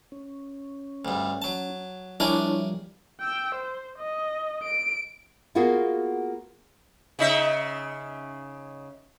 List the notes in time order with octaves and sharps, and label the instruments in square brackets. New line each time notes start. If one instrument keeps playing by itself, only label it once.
[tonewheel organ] C#4
[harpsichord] D2 G2
F#3 A5
[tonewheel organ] F3 G3 [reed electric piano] D4 E4 C#5 [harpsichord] A#4 D5 G#5
[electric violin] G5 E6
C5
D#5
D7
[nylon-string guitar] A#3 B3 F4 F#4 G#4
[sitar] C#3 D#4 E5